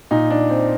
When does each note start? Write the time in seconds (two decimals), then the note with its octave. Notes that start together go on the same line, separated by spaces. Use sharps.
0.11 A#2 D#4
0.30 D4
0.50 C4